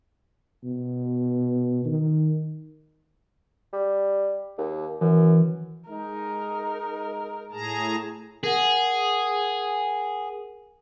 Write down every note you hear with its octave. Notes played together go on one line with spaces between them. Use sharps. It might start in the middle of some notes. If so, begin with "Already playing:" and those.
B2
D#3
G3
D#2
F#2 E3
G#3 D#4 A#4
A2 G#4 A5 A#5
G#4 A#4 F#5